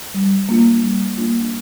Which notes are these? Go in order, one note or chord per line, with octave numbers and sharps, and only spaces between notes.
G3
A#3 D4 F4
G3
A#3 D4 F4